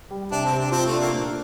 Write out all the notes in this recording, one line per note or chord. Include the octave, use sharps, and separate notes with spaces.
G3
C3 D4
C4
C3
D4
C4 F4
A3
D4
A#3
A#2